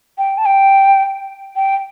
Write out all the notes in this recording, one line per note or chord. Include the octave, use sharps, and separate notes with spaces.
G5
A5
G5
G5